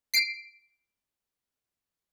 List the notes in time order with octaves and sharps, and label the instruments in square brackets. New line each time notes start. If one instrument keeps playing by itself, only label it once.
[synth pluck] C7 D7